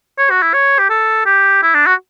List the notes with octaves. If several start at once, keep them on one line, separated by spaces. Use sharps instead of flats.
C#5
F#4
E4
C#5
G4
A4
G4
E4
D4
F#4